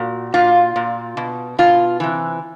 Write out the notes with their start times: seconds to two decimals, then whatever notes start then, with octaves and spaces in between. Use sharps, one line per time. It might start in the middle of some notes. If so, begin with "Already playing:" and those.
Already playing: A#2 F#4
0.34 A#2 F4
0.76 A#2
1.17 B2
1.58 B2 F4
2.00 C3 E3